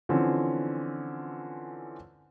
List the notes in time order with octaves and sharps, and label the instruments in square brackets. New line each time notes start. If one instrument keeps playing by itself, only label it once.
[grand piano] D3 E3 F3 C4 C#4